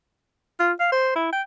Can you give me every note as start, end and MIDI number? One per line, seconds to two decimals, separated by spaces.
0.60 0.73 65
0.80 0.89 77
0.92 1.13 72
1.16 1.29 64
1.32 1.42 79